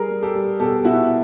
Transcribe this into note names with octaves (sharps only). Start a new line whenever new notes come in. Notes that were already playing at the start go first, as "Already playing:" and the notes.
Already playing: G3 G#4 A#4
G3
G4 A4
G3
B2 G4 A4
B2 E4 F#4